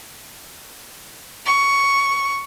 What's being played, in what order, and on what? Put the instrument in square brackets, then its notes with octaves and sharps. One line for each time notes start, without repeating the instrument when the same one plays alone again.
[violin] C#6